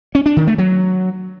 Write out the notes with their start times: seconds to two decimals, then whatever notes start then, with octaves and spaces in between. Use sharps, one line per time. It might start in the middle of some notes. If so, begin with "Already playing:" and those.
0.15 C#4
0.26 D4
0.37 D#3
0.47 A3
0.58 F#3